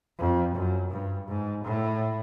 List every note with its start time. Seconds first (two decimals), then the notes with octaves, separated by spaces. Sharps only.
0.19 F2
0.56 F#2
0.92 G2
1.28 G#2
1.64 A2